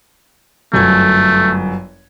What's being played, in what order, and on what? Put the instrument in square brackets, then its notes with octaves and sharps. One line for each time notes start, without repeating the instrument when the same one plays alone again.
[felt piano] G1 F#2 G#6 [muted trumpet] A3